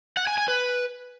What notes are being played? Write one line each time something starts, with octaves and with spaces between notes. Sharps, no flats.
F#5
G#5
G#5
B4